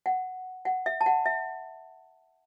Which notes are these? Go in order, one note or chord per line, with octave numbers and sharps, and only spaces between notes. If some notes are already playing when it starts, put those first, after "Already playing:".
F#5
F#5
E5
A5
F#5
E5